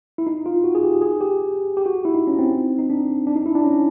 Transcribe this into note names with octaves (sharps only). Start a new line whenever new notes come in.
E4
D#4
F4
F#4
G#4
G4
G#4
G4
G4
F#4
E4
D#4
C#4
C4
D#4
D4
D4
D#4
E4
D4
C#4